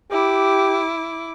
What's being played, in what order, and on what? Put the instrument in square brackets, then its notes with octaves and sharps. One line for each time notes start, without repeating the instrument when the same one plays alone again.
[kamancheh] E4 D6 [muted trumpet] G4